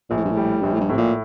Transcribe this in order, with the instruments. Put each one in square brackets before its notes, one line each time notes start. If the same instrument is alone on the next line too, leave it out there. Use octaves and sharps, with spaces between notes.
[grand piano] A#1 [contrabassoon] A#2
[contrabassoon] A2
G2
A2
[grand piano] G3
[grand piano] A#1 [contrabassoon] G2
[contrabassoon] A2
G2
[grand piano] A2 [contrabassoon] C3
[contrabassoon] A#2